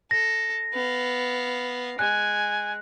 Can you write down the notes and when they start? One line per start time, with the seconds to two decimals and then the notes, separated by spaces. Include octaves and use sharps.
0.11 A4 A#6
0.73 B3 F5
1.99 G#3 G#5 F#6